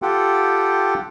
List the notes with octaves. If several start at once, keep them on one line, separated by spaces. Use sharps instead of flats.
F4 G4 A4 F#5 G5